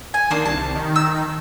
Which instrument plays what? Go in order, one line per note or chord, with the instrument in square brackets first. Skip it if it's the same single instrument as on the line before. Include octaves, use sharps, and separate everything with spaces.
[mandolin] G#5
[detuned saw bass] D#3 [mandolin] A#3 D4 C6
[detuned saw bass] C2 [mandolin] A5
[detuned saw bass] D#3
[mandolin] E6